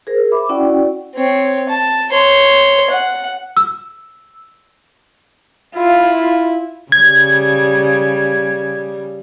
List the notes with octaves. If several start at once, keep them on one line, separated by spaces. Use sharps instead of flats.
G#4 A#4 C5
E5 B5 D6
C#4 E4 F#4 D5 F#5 G5
C4 C#5
A5
C#5 C6
F#5
E6
E4 F4
C#3 G3 G#6